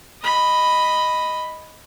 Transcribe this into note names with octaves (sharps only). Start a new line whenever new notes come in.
D#5 B5